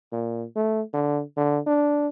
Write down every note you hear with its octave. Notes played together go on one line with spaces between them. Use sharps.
A#2
A3
D3
D3
D4